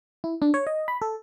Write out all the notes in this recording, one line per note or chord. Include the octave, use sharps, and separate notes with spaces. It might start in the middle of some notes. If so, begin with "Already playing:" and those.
E4
D4
C#5
D#5
B5
A4